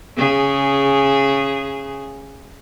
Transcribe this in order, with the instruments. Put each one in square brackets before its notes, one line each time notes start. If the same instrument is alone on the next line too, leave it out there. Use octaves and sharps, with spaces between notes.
[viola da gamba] C#3 G#4